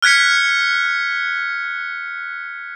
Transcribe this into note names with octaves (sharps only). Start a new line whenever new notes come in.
F6 F#6 G#6 B6 C#7